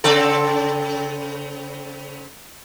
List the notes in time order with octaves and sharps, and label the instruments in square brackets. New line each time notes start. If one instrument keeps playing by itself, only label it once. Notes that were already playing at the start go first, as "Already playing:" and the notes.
[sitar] C#3 C4 A4